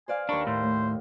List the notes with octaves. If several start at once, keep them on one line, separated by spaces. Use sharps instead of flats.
C5 D5 F5 G#5
D#2 D4 A#4 B5 C#6
A2 C5
A3